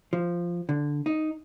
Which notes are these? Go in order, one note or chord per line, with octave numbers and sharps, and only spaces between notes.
F3
D3
D#4